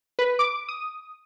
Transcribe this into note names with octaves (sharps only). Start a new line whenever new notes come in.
B4
D6
D#6